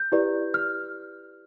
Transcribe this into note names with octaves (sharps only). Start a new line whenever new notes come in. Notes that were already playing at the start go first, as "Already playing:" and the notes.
Already playing: G6
E4 G4 B4 D5
F6